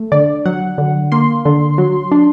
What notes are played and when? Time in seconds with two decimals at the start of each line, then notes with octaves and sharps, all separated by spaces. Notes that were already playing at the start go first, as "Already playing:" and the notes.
Already playing: A3
0.12 D3 D5
0.46 F#3 F#5
0.78 D3
1.12 A#3 C6
1.45 D3
1.78 F#3
2.12 D4